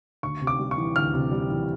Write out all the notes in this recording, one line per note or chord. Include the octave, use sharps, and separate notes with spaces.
D2 C#6
C3
D6
G3
C#6
E3
D2 F6
C3
G3
E3